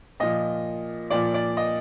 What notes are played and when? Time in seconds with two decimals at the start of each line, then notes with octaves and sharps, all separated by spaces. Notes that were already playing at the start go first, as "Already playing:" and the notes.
0.20 A#2 F3 D#5
1.10 A#2 F3 D5
1.34 D5
1.57 D#5